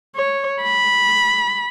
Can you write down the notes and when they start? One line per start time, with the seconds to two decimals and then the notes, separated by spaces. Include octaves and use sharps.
0.16 C#5
0.63 B5